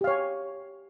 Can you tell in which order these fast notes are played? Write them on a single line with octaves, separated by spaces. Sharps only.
G4 F5 C#5 G#5